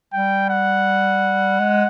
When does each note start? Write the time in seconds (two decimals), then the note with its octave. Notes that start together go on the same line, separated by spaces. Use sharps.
0.13 G3 G5
0.50 F#5
1.60 G#3